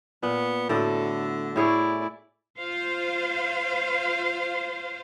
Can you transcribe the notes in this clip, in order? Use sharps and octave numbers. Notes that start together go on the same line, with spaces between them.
A#2 B3
A2 D3 B3 F#4 A4 D5
A2 E4 G#4 C#5 D5
F4 C5 F5